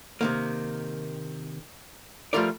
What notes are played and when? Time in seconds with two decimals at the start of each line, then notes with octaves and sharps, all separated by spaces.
0.21 C3 D#3 A#3
2.33 F3 G3 A3 F4 A#4 D5